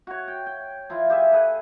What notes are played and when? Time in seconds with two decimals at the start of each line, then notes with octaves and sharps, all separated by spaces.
0.07 F#4 C#5
0.28 G5
0.47 G5
0.90 F3 E4 F4
1.10 G4 G#4 E5
1.32 G#4 A4 B4